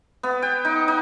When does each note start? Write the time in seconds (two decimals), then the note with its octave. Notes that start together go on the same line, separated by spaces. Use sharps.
0.23 B3
0.42 G5
0.65 D#4
0.88 D#4